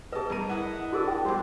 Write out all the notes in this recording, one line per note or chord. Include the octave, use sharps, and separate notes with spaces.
G#4 B4 D#5 A5
G2 A#4 D#7
E4 D#5 F#5
D4 F#4 G#4 A#4
G5
G2 G#3 C5